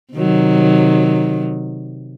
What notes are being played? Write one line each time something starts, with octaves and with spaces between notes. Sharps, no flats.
C3 D#3 F#3